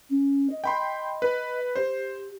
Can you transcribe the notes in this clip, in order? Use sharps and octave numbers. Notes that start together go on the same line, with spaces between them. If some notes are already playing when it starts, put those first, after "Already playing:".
C#4
D#5
G5 B5 C6
B4
G4 C5